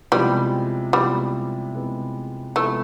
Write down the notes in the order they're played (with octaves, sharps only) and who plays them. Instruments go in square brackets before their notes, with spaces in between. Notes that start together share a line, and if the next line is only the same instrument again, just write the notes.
[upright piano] C3 F3 G#3 B3 E4 [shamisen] G3
[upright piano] C3 F3 G#3 B3 E4 [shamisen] G3
[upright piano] C3 F3 G#3 B3 E4
[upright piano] C3 F3 G#3 B3 E4 [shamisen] A3